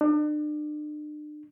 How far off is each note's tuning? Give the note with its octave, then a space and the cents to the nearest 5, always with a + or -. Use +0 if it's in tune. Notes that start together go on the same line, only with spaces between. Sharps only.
D4 +40